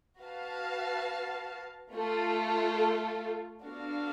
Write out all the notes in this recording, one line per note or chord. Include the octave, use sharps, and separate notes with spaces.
F#4 B4 F5 A5
A3 F4 A4
B3 D4 F#4 A4 F5